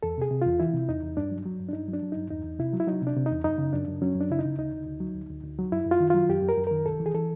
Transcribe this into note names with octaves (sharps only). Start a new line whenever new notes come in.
E2 A4
C3 G#4
C3
E2 F4
E3 E4
C3
E2 D#4
E2
G2 D4
F#3
F#3
G2
D4
G2 D#4
F#3
D4
F#3
G2 D#4
E2 D#4
E2
C3 E4
F#3
E4
F#3 D#4
C3 D4
C3
E2 D#4
F#2 D#4
C#3
F#2 D4
F#2
F#3 C#4
F#2
D4
C#3 E4
D#4
C#3
D2 D#4
D2
D2
F#3
D2
D2
D2
F#3
F#2 E4
F#2
F4
D#3
F#3 F4
F#2 G4
F#2
A#4
F#2
D#3 A#4
C2 A4
E3
G#4
E3 A4